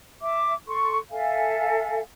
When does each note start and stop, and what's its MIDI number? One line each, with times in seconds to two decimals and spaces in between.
0.21 0.54 76
0.21 0.54 86
0.68 0.98 69
0.68 0.98 84
0.68 0.98 85
1.11 2.00 69
1.11 2.00 76
1.11 2.00 77
1.11 2.00 80